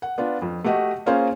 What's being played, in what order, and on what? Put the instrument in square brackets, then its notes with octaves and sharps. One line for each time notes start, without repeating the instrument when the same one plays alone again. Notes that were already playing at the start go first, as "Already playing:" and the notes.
[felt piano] F#5
B3 D4 F4
F2
A3 F#4 G4 D#5 F#5
A#3 C#4 F4 G#4 C5 F5